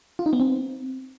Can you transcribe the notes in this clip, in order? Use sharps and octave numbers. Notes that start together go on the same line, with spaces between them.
F4
D#4
B3
C4